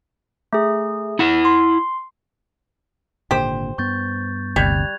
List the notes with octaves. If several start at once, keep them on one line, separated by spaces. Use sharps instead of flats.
A3 G#4
E4 F#5
C6
G#1 A#2 D3 G4 C5
G2 B3 C#6 G6 A6
G1 D2 C3 G3 F#6 G#6 F7